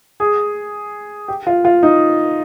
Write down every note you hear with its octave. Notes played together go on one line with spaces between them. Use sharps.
G#4
G4
F4
F4
D#4